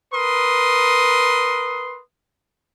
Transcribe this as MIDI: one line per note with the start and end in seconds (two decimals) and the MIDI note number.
0.14 2.01 70
0.14 2.01 71
0.14 2.01 84
0.14 2.01 87